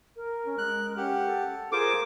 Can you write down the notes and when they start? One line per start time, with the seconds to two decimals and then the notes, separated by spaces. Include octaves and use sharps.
0.16 A#4
0.46 C#4
0.58 G#3 F#6
0.97 C#4 G4 F#5
1.27 A4
1.72 F4 G#4 A#4 C5 D6